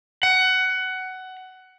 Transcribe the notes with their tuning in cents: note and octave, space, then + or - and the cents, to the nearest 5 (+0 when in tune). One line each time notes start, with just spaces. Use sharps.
F#5 +15